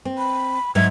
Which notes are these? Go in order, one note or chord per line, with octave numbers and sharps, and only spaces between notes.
C4
B5
G#2 F#3 E5 G#6